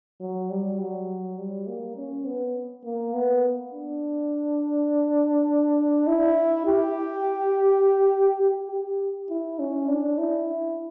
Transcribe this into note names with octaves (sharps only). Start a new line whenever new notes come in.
F#3
G3
F#3
G3
A#3
C#4
B3
A#3
B3
D4
E4
G4
G4
G4
E4
C#4
D4
E4